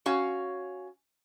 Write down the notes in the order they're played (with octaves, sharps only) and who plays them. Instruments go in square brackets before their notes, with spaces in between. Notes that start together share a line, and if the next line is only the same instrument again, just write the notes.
[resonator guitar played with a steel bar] C#4 F#4 C#5 F5